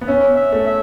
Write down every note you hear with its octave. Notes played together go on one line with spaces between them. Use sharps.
B3
C#4 E5
E5
A3
E5